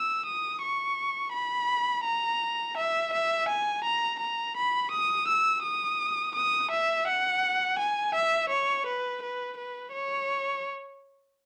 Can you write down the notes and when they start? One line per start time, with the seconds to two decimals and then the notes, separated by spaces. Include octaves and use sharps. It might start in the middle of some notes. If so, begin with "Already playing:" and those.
Already playing: E6
0.26 D#6
0.62 C#6
1.33 B5
2.05 A#5
2.77 E5
3.13 E5
3.49 G#5
3.84 A#5
4.20 A#5
4.57 B5
4.91 D#6
5.28 E6
5.63 D#6
6.35 D#6
6.71 E5
7.07 F#5
7.79 G#5
8.14 E5
8.50 C#5
8.86 B4
9.22 B4
9.57 B4
9.93 C#5